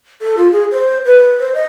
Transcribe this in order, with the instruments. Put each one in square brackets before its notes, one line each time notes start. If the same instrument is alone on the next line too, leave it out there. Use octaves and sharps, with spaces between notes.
[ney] A4
F4
G#4
C5
B4
C5
D#5